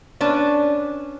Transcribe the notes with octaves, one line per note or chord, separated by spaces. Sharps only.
C#4 D4 B4 A5